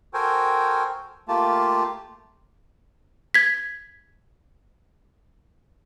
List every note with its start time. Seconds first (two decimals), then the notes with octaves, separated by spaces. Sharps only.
0.14 F#4 A4 A#4 C5 G5 G#5
1.28 A3 A#3 F4 G4 A5
3.34 G#6 B6